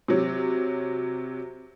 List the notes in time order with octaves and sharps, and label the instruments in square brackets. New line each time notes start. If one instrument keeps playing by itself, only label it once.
[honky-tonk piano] C3 F#3